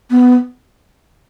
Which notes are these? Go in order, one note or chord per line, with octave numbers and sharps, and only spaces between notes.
B3